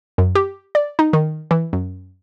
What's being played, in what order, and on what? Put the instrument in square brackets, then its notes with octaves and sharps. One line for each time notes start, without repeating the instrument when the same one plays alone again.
[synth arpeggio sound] F#2
G4
D5
D#4
D#3
E3
F#2